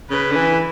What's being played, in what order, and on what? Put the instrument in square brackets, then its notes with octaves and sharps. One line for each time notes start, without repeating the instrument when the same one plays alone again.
[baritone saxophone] C#3 [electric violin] B4
[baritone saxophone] D3
E3